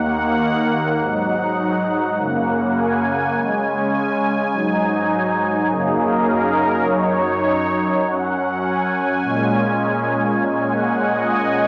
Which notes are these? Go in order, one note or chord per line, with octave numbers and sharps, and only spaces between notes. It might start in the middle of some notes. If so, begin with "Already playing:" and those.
Already playing: D#2 D#3 A#3 F#5
G#2 F#3 D#4 F#5
F#2 C#3 A#3
G#5
C#3 G#3 C#4 G#5
G#5
G#2 F#3 D#4
F#2 C#3 F#3 A#3 D#4 G#4
A#4
A#4
A#4
F#2 F#3 D#4 C#5
F#2 F#3 C#4 F#5
G#5
A#2 G#3 C#4
A#2 G#3 C#4 G#5
F#5
D#5
G#5